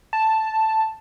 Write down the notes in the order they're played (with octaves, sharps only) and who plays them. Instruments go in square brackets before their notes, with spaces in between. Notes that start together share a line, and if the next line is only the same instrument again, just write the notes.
[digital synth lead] A5